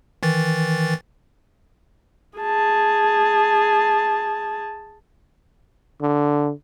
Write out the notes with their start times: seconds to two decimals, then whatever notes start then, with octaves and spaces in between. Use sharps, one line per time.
0.23 D#3 E3 A6
2.38 G#4 A5
6.01 D3